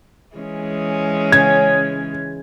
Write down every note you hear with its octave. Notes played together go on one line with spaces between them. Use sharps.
E3 G#3 C#4
C#3 G#6